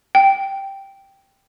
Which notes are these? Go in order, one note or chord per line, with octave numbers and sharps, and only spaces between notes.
G5